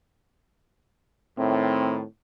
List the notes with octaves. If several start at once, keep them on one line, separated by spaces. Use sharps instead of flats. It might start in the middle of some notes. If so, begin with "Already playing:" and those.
A2 D#3 C4